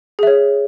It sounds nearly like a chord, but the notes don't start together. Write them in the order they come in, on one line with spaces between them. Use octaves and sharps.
G#4 E5 C#5